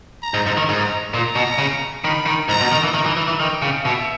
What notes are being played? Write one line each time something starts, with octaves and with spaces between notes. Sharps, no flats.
A#5
G#2
G#2
D#3
G#2 A#5
A#2 A#5
B2
C#3
D#3 B5
D#3
G#2 A#5
B2
D#3
E3
D#3 A#5
E3
E3
E3
D#3 G5
C#3
B2 E5